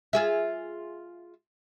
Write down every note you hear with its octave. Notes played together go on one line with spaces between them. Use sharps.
F4 G#4 E5